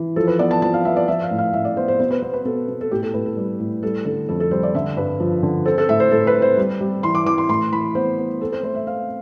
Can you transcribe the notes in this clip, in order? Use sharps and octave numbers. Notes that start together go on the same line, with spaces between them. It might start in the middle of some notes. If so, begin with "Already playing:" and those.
Already playing: E3
F3 A4
B4
B3 D5
A5
F3 A5
F5
B3 E5
D5
F3 E5
F5
A2
F5
A2 E5
D5
B3 C5
C5
B2 C5
B4
B3 C5
B4
B2 A4
B2
A4
A2 G4
A4
A2 B4
A4
G3
A2
G3 A4
D3 A4
F2 A4
A4
G3 C5
D5
D3 E5
G2 B4
F3
D3
C4 A4
A4
A2 E5
C5
A2 A4
B4
C4
C5
G3
G3
E3 C6
D6
E3 D6
C6
A2 C6
E3 B5
B3 C5
B3
C4 A4
C5
A3 C5
E5
C4 F5